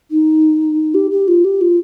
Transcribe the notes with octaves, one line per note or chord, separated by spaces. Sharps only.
D#4
G4
G4
F4
G4
F4